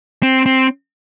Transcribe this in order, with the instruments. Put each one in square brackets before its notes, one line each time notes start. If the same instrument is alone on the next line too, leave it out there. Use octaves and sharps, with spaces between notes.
[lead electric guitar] C4
C4